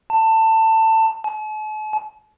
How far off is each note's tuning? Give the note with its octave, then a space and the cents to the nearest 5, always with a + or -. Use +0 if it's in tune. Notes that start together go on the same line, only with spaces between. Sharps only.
A5 +20
A5 -45